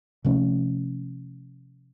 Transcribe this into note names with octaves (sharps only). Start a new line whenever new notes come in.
C3 F3 A3 C#4